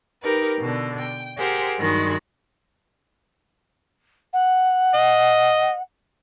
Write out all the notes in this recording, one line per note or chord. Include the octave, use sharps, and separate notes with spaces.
D#4 G4 A#4 B4
B2 D3
G5
G4 G#4 A#4 C5 F#5
G2 D#3 F#3 G#3 B5
F#5
D#5